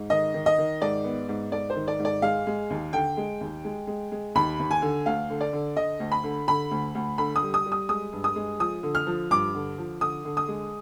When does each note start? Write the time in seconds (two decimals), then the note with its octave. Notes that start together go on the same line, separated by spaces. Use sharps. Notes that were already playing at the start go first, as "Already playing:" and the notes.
Already playing: G#2
0.10 D#3 D#5
0.34 D#3
0.46 D#5
0.58 D#3
0.81 G#2 D5
1.04 B3
1.29 G#2
1.52 G#2 D5
1.70 C5
1.75 D#3
1.88 D5
1.99 G#2
2.05 D5
2.22 G#3 F5
2.47 G#3
2.70 D#2
2.93 D3 G5
3.17 G#3
3.41 D#2
3.65 G#3
3.87 G#3
4.12 G#3
4.35 D#2 B5
4.59 D#2
4.71 G#5
4.82 D3
5.06 D2 F5
5.30 D3
5.41 D5
5.53 D3
5.77 D3 D#5
6.00 D2
6.12 B5
6.24 D3
6.47 D3 B5
6.71 D2
6.95 D2
7.18 D3 B5
7.36 D#6
7.42 G3
7.54 D#6
7.66 G3
7.72 D#6
7.89 G#3 D#6
8.13 G2
8.24 D#6
8.36 G#3
8.59 F3 D#6
8.83 D3
8.95 F6
9.07 F3
9.31 G2 D6
9.55 D3
9.78 F3
10.01 D3 D#6
10.25 D3
10.37 D#6
10.48 G#3